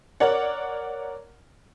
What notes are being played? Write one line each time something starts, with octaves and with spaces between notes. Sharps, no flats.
A#4 C#5 D5 F#5